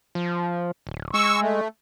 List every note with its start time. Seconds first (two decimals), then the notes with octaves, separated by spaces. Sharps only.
0.15 F3
0.87 D1
1.14 G#3 C#6 E6
1.41 A3